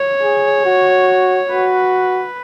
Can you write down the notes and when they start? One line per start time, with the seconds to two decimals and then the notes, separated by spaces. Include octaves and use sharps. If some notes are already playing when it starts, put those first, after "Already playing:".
Already playing: C#5
0.22 G#4
0.65 F#4
1.50 F#4 B4